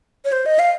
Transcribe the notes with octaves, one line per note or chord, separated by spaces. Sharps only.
C#5
C5
D#5
F5